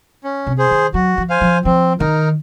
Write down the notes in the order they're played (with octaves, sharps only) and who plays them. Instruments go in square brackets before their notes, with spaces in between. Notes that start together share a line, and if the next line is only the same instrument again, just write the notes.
[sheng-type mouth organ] C#4
[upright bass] C3
[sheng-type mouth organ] G#4 C5
[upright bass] D#3
[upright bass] F#3 [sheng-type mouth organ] F#4
[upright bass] F3
[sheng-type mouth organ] C5 F5 G#5
[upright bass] F3
[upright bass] F3 [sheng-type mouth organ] C4
[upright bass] D#3 [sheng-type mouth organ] D#4 A#4